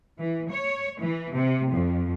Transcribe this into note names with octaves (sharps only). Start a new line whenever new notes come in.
E3
C#5
E3
C3
F2